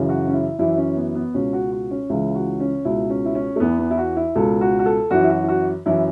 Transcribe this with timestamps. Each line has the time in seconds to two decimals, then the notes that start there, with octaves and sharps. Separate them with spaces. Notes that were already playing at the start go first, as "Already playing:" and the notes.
Already playing: F#2 C#3 E3
0.09 F#4
0.27 C#4
0.34 E4
0.59 F#2 E3 E4
0.78 C#4
0.96 B3
1.15 B3
1.34 C#2 B2 C#4
1.53 F#4
1.72 F#4
1.91 C#4
2.10 C#2 C#3 E3 E4
2.35 F#4
2.60 C#4
2.85 C#2 B2 E4
3.10 C#4
3.25 E4
3.35 C#4
3.56 A3
3.60 E2 E3 B3
3.79 B3
3.91 E4
3.98 F#4
4.17 E4
4.35 C#2 B2 A4
4.61 F#4
4.79 F#4
4.86 A4
5.11 F#2 E3 F#4
5.24 E4
5.30 F#4
5.44 E4
5.48 F#4
5.86 F#2 E3 E4